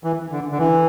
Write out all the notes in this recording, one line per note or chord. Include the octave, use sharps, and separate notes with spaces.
E3
D3
D3
E3